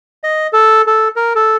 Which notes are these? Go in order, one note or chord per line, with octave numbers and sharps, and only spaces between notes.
D#5
A4
A4
A#4
A4